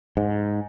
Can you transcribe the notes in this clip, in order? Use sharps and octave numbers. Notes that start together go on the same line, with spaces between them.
G#2